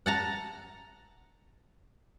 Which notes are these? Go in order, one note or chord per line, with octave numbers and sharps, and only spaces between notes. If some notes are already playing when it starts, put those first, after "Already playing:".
F#5 A5 A#5